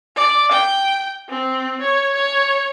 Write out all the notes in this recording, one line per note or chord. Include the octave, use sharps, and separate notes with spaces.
D5
G5
C4
C#5
C#5